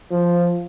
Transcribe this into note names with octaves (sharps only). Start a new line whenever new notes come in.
F3